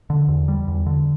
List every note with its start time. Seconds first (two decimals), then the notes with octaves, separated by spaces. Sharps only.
0.10 D3
0.28 E2
0.48 G3
0.68 E2
0.86 D3